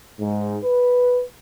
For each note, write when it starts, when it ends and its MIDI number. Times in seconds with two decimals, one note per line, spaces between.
0.20 0.57 44
0.64 1.22 71